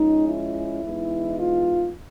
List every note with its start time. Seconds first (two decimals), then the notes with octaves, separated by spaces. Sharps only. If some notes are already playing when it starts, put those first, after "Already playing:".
Already playing: F3 G#3 C#4 D#4
0.28 E4
0.84 E3 G#3 B3 D#4
1.39 F4